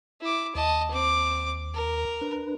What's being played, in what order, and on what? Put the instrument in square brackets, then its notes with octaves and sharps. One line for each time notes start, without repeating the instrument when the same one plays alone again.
[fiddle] E4 D6
[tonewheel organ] D#2 [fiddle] D#5 A5
[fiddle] C4 D6
A#4
[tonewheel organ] D4 B4